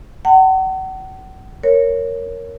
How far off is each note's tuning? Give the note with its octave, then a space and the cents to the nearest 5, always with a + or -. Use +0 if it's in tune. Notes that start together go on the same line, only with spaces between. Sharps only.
F#5 +40 A5 +45
A#4 +0 C#5 +0